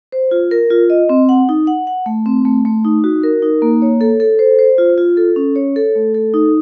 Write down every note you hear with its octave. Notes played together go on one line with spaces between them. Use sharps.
C5
F4
A#4
F4
D#5
C4
F#5
D#4
F#5
F#5
A3
C4
A3
A3
D#4
F#4
A#4
D#4
A#3
C#5
A4
A4
C5
C5
F4
F4
A4
C#4
C#5
A4
A3
A4
D#4